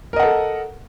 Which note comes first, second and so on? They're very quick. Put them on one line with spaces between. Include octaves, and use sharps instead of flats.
A#4 D#5 F#5 A4